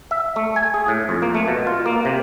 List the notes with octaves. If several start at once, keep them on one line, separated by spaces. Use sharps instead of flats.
E5
A3
G#5
G#4
A2
F2
A#3
A3
B2
F4
A#3
C3